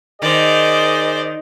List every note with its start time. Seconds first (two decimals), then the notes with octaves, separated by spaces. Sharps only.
0.22 D#3 G#4 A#4 C5 D5 D#5